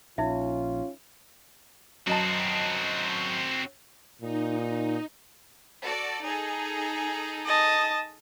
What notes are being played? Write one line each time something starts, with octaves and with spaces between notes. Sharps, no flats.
A#1 C#4 D#4 F4 E5
F#2 C4 F#4 D#5 A5
A#2 D#4
F#4 A4 D5
D#4 G#4 A4
D#5 A5